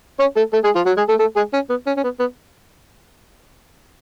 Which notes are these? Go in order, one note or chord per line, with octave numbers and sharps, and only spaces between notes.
C#4 C#5
A3 A4
A3 A4
G#3 G#4
F3 F4
F#3 F#4
G#3 G#4
A3 A4
A3 A4
G#3 G#4
C#4
B3
C#4
C#4
B3
B3